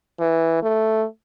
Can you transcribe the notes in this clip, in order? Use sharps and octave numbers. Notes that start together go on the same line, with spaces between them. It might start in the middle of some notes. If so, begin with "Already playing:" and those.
E3
A3